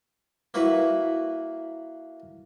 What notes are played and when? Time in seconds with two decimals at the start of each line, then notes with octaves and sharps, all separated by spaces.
0.54 A#3 E4 F#4 B4